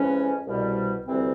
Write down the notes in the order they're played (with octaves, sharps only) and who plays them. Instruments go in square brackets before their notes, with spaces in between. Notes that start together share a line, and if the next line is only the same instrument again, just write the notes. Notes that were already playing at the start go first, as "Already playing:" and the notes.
Already playing: [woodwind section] F2 C#3 E3 G#3 C#4
C2 B2 G3
D2 C3 E3 G3 C4